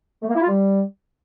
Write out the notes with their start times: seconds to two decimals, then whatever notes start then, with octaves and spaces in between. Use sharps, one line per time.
0.22 A3
0.29 A#3
0.35 E4
0.42 F4
0.48 G3